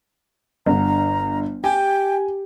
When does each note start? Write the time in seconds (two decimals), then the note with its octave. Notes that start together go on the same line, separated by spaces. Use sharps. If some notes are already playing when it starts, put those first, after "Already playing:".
0.66 G1 D3 A#5
1.64 G4 G5 G#5